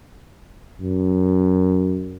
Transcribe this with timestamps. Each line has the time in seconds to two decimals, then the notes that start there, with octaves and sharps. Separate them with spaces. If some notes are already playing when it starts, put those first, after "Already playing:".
0.81 F#2